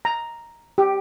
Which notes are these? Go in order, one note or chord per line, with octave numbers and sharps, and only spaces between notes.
A#5
G4